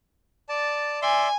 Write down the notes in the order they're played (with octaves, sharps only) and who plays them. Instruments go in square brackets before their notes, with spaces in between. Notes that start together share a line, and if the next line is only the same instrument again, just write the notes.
[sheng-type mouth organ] D5 A5
[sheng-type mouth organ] D5 E5 C6 [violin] G#5